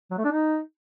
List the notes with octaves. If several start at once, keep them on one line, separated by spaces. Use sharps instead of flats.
F#3
A3
D4
D#4